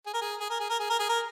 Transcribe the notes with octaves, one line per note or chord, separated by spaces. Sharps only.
G#4
A#4
G#4
G#4
A#4
G#4
A#4
G#4
A#4
G#4
A#4